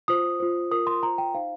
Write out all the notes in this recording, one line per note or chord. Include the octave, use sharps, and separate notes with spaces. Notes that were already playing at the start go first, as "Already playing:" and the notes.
F4 C5 D#6
F4 C5
F4 A#4 D#6
C6
F4 C5 A#5
G5
D#4 C5 F5